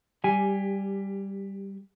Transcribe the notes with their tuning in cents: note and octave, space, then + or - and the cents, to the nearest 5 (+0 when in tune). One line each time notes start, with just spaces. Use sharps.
G3 +0 G4 +20 G#5 +0